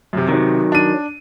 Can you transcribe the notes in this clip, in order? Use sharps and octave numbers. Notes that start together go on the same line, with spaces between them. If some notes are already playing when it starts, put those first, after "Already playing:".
F#2 C3
C3 D#3 F#3
D4 D#7